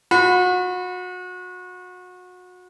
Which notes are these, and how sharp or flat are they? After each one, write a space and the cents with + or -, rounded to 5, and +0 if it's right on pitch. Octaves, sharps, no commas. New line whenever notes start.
F#4 -30 B5 +25